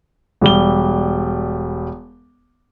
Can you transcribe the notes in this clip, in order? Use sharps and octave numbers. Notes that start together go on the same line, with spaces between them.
E1 G3 G7